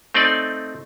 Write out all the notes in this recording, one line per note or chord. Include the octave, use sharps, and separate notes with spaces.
A3 C4 D#4 D5